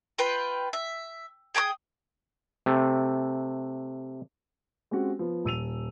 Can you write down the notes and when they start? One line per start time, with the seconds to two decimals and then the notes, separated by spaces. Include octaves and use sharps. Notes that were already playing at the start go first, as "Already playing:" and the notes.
0.18 F4 B4 G5
0.73 E5
1.55 G#4 G5 A#5 D#6
2.66 C3 A3
4.91 G#3 C4 C#4 F#4 G4
5.19 F3 B3
5.44 D#1 E6 D#7 F7